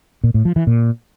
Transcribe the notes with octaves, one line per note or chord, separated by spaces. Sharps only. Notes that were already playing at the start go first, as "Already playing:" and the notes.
A#2
A2
F3
E3
A#2